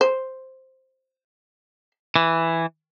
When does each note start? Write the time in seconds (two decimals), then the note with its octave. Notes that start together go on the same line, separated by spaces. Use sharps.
0.01 C5
2.16 E3